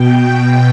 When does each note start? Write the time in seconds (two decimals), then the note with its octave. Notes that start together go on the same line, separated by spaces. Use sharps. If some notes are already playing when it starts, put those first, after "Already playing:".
Already playing: B2 G5
0.23 G5